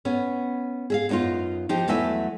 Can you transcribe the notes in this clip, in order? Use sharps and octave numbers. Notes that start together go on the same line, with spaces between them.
B3 C#4
G#4 E5 F5
F#2 B3 D4 D#4 F4
F3 D#4 G4
E2 F#3 A3 B4 E5 G#5